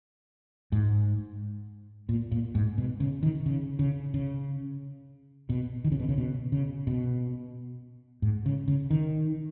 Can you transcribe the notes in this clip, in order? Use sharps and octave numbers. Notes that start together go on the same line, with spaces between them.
G#2
A#2
A#2
G#2
B2
C#3
D#3
C#3
C#3
C#3
B2
D#3
C#3
B2
C#3
B2
C#3
B2
G#2
C#3
C#3
D#3